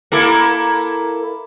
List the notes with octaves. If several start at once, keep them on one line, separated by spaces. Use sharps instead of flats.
A#3 E4 A4